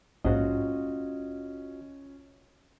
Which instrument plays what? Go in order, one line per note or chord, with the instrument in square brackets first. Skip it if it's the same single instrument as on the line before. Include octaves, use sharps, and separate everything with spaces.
[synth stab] A#1 G#2 [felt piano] C#4 [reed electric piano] F4 F#4 D#5